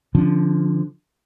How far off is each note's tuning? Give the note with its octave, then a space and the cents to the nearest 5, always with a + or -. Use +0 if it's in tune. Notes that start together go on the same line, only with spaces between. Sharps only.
D3 +0 F3 +0 C#4 -25